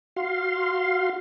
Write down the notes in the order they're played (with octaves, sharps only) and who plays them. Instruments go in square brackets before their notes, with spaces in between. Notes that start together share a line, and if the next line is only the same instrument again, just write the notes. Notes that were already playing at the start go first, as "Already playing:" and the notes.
[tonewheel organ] F#4 F5 C6